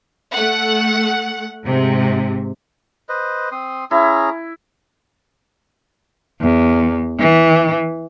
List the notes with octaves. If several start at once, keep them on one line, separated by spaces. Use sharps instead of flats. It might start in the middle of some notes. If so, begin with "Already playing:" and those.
A3 F#5
G#2 C3
B4 C5 D#5
C4 C6 D#6
C#4 E4 G#4 A#5
E2
E3